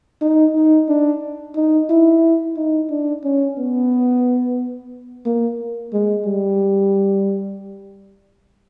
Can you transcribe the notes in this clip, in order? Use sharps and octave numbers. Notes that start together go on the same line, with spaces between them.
D#4
D#4
D4
D#4
E4
D#4
D4
C#4
B3
A#3
G#3
G3